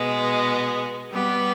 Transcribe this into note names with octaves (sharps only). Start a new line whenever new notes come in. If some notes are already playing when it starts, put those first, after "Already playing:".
Already playing: B2 G#3 B3
G3 B3 G4 B4